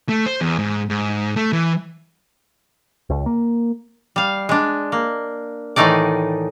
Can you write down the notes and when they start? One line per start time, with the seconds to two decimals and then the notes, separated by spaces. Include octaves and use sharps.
0.09 A3
0.26 C5
0.41 E2
0.59 G#2
0.90 G#2
1.36 A3
1.53 E3
3.10 C#2
3.26 A#3
4.16 G3 F5
4.49 G#3 D4
4.92 A#3
5.76 A2 D#3 E3 A3 D#4 D5